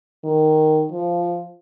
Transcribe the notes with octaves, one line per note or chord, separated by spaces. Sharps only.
D#3
F3